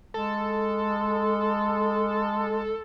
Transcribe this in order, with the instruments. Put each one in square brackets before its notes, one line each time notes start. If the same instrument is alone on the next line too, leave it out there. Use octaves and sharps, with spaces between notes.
[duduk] G#3 [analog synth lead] A4